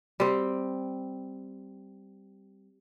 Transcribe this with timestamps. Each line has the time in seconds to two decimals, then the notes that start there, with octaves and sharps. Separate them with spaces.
0.20 G3 C4